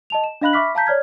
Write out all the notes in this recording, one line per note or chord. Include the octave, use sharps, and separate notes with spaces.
D#5 A5 F7
E7
D4 D#5 F5 B5 F#6 F#7
E5 B5 C#6 D6 F6 B6
F5 A5 A#5 G6 B6
C#5 D5 F6 G#6